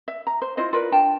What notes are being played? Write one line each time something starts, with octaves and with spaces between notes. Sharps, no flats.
E5
A#5
C5
E4 F4 C5 D#5
F4 A#4 B4 D5
D4 G5 A5